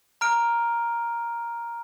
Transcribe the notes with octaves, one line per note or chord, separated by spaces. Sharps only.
A#5 F6 D7